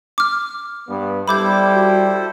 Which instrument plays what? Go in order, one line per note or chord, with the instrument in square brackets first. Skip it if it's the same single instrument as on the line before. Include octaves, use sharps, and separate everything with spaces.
[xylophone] D6 F6
[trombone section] G2 B3
[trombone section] G3 [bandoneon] E4 A4 C5 [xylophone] B5 D6 G6
[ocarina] F#4